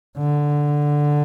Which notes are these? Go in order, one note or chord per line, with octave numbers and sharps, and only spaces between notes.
D3